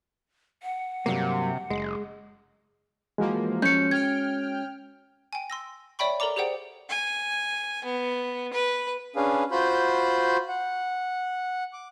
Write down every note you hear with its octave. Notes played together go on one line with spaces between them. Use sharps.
F#5
G2 C3 F#3 A#3
F#1 G#3
E3 F3 G#3 A#3 F#4
F3 C#4 G6 C#7
G5 F6 G#6
G5 G#5
C6 E6 A#6
C#5 D5 E5 G5 B5 C#6
A4 A#4 D5 A#5 D6
G4 G#4 C5 D5 F#5 G5
G#5
B3
B4
C#4 D4 G#4 B4 F5
F4 F#4 C5 B5 C6 G6
F#5
D6